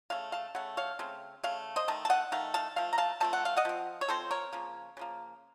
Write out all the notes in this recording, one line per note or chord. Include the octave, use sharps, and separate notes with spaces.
C#3 A3 F5
F5 A5
C#3 A3 F#5
C#5 F5
C#3 A3 C4
C#3 A3 F5
C5 D#5
D#3 A3 A5
A5
D#5 F#5
D#3 A3 F5
F5 A5
F3 A3 F5
A#5
F5 A5
F3 A3 C4 A5
F#5
F5
D#5 F#5
F3 C4
C#5
F3 C4 A4 C5
A#4 C#5
C#3 F3 A#3
C#3 F3 A#3